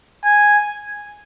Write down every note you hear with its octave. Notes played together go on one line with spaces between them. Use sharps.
G#5